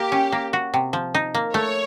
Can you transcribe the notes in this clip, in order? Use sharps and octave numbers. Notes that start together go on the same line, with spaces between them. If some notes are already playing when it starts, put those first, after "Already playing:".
Already playing: A#3 G4
C#4
A#3
F#4
C3
F3
D#4
A#3
A3 C#5